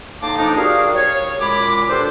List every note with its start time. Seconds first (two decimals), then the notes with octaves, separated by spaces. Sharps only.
0.22 A2 A#3 D#4 A5 C6 D6
0.38 F2 F3 D4 D#4
0.56 G3 F#4 G#4 A#4 F5
0.96 C#5
1.40 F#2 A#2 G#3 B5 D6
1.89 G3 D4 F4 A4 B4 C5